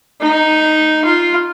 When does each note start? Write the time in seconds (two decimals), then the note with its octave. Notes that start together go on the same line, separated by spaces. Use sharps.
0.21 D#4
1.05 F4